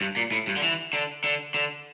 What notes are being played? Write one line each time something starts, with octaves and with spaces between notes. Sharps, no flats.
G2
A#2
A2
G2
D3
E3
D3
D3
D3